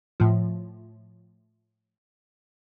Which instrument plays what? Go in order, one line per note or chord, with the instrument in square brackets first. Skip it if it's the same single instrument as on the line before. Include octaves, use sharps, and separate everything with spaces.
[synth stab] A2 F3